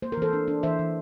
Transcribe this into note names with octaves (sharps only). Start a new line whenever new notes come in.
A#3 C5
A#4
E3 A4 C5
D4
D4
E3 C5 E5
E3